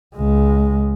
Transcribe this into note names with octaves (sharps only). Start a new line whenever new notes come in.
C#2 G#3